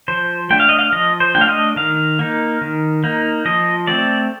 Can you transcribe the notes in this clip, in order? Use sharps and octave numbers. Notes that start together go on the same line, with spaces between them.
F3 C5
A3 D4 G5
F5
D#5
F5
F3 D#5
C5
A3 D4 F5 G5
D#5
D#3 F5
A#3 D#4
D#3
A#3 D#4
F3 D#5
A3 C4 D5